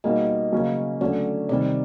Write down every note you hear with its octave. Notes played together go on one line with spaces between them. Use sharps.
B2 G3 A#3 D#4 G#4 D#5
C#3 F#3 A#3 C#4
D3 F#3 A3 C#4 D5
C3 D#3 G3 D5